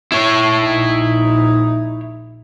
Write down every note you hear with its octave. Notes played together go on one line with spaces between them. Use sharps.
E4 C#5
A#1 D#4